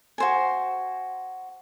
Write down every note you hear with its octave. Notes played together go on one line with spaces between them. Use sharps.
F#4 C5 G#5